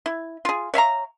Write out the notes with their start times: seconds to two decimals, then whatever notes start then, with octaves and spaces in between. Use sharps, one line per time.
0.06 E4
0.45 F4 G#4
0.74 C#5 E5 F5 A#5